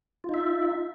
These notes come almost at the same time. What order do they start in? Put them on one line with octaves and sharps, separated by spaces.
F4 D#4 E5